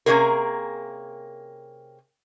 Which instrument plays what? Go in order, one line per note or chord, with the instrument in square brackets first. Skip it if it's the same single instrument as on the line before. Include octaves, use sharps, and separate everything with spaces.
[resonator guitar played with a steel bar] C3 A#3 C#4 F4 G#4 A#4